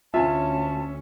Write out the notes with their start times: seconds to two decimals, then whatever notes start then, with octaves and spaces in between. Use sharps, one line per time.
0.14 D2 C#4 F4 E5 G#5 A5